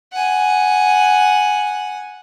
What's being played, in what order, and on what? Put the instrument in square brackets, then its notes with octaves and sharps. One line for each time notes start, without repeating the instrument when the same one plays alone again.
[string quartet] F#5 G#5